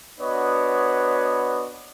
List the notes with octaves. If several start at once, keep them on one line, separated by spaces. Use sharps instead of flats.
B3 D4 F#4 B4 C#5 D#5